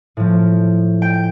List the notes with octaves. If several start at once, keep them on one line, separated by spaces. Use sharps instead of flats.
A2 F3
G5